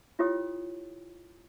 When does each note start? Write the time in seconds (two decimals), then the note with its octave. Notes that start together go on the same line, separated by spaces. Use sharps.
0.19 E4 F4 G4 C#5 G5 D#6